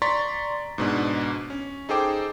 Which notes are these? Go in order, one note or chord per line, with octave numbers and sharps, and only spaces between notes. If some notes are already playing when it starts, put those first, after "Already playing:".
D5 A#5 C6 C#6 A6 B6
G#2 B2 D4
C#4
D#4 G#4 A4 C5 G5 D6